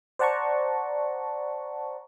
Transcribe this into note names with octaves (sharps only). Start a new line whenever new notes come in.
C5 D5 F#5 A5 A#5 C#6